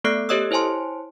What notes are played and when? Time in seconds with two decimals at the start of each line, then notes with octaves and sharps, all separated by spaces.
0.04 A3 B3 A4 D5 F#6 C7
0.29 G4 A4 C#5 D#5 D#6 E6
0.51 E4 C5 C#5 G#5 A5 C6